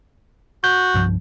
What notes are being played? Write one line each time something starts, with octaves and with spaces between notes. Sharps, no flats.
F#4 G6
C2 G2 F3